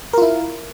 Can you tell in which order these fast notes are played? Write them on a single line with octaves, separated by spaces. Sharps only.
A#4 F4 E4